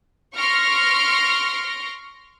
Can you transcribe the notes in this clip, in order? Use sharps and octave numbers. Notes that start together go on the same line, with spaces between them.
C6 C#6 F6 A#6 D7